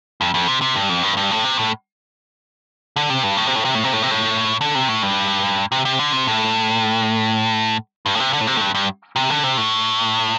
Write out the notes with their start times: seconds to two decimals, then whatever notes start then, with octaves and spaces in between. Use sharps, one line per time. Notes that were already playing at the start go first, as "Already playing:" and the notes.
0.21 F2
0.34 F2
0.48 C3
0.62 C3
0.76 G2
0.89 F2
1.03 G2
1.17 G2
1.31 A2
1.44 C3
1.59 A2
2.96 D3
3.10 C3
3.23 G2
3.37 A2
3.47 C3
3.56 A2
3.65 C3
3.75 A2
3.84 C3
3.93 A2
4.03 C3
4.11 A2
4.61 D3
4.75 C3
4.88 A2
5.03 G2
5.72 C3
5.85 C3
5.99 D3
6.13 C3
6.27 A2
8.06 G2
8.15 A2
8.20 C3
8.33 D3
8.41 A2
8.47 C3
8.57 A2
8.61 G2
8.75 G2
9.16 C3
9.30 D3
9.44 C3
9.58 A2